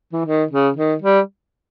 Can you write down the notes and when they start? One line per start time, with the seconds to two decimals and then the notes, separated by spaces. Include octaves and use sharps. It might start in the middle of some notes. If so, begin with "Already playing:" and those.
0.13 E3
0.26 D#3
0.51 C#3
0.77 D#3
1.02 G3